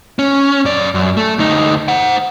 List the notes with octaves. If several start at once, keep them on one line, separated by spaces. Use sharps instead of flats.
C#4
F#2 D5
F#2
A3
D2 D#4
C5 F#5